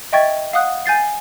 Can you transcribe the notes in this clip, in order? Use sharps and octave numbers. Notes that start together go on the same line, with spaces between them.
D#5 E5 G5 C#6 G#6 A6
F5 F#5 D#6 F#6
G#5 G6 A6 C7